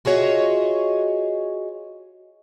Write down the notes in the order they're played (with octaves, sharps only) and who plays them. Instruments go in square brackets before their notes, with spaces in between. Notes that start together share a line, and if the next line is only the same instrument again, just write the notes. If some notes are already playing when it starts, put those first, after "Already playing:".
[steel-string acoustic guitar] F4 F#4 G#4 C#5 D#5 E5